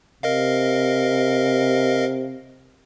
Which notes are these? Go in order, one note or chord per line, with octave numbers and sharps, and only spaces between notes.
C3 A#4 D#5 F5